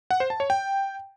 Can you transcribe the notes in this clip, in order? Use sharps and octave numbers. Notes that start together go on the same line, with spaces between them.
F#5
C5
A5
C#5
G5